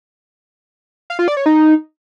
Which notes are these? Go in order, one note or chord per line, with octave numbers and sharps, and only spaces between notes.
F5
F4
D5
C#5
D#4